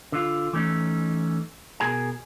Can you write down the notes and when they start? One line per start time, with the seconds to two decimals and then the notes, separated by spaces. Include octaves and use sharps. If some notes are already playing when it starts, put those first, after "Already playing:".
0.12 D3 F4
0.53 E3 A3 C#4 D#4
1.80 B2 G#4 A#4 G#5